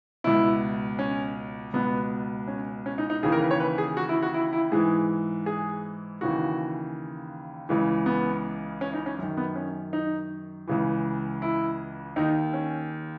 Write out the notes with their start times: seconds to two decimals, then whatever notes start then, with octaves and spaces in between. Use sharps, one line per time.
0.24 C#2 B2 E4
0.99 C#4
1.73 C#2 B2 B3
2.48 C#4
2.86 C#4
2.98 D#4
3.10 D#4
3.23 D#2 C#3 E3 G#4
3.32 A#4
3.41 B4
3.51 C#5
3.60 B4
3.78 G#4
3.97 F#4
4.09 E4
4.22 F#4
4.34 E4
4.53 E4
4.72 G#2 E3 G#4
5.46 G#4
6.21 D#2 C#3 E3 F#4
7.69 C#2 C#3 E3
8.06 B3
8.81 C#4
8.93 D#4
9.06 C#4
9.19 F#2 D#3
9.37 B3
9.56 C#4
9.93 D#4
10.68 C#2 C#3 E3
11.42 E4
12.16 D#2 D#3 D#4
12.54 C#4